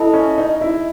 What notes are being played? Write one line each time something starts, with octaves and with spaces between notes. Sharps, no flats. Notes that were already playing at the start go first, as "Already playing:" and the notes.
Already playing: E4 A4 D#5 A5
C#4
D#4
E4